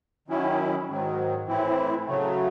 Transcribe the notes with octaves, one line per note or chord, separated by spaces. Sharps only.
D#3 F#3 C#4 E4
G#2 D#3 F#3
A2 E3 C4 E4
C#3 F#3 A3